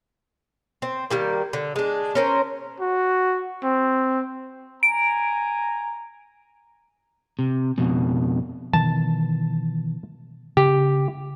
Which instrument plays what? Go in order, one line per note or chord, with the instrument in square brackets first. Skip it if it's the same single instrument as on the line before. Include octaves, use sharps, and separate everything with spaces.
[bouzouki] C4
D#3 G3 A#3
D3
G#3 D4
C#4 A#4 C5
[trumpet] F#4
C4
[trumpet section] G#5 A#5 [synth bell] D7
[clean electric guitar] C3
F2 B2
[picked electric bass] B2 D#3 E3 [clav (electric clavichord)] A5
[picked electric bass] C#3 [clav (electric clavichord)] G4